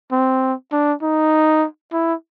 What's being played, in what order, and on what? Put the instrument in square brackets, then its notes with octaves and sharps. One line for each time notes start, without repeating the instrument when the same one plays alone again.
[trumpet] C4
D4
D#4
E4